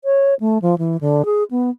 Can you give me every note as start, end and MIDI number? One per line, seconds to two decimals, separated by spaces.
0.04 0.34 73
0.40 0.58 57
0.62 0.75 53
0.78 0.97 52
1.01 1.25 50
1.25 1.43 68
1.51 1.70 59